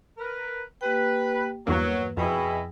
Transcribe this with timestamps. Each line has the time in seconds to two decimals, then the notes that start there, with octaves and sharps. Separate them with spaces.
0.17 A#4 B4
0.81 A#3 G4 B4 G5
1.67 E2 G2 F#3 A#3 B4
2.17 F2 B2 E4 G#4 D#5 G5 G#5